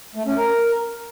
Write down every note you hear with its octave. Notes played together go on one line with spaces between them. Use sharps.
A3
C#4
A#4